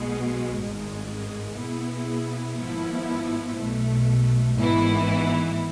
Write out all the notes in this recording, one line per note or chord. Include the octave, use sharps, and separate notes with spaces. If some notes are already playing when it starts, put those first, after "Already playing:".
Already playing: B1 B2 G#3
G#1 G#2 G#3
B2 B3 E4 G#4
G#1 G#2 F3 B3 E4
B1 B2 A3
G#1 G#2 E3 B3 E4